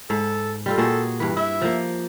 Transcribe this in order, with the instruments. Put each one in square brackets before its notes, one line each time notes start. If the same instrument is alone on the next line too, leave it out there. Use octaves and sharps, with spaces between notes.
[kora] G#2 [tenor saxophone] A4
[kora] G3 F4 A4
[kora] A#2 F#4 G#4 [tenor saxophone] A4
[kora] G2 B4 [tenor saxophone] E3
[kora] E4 [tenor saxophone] E5
[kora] F3 A#3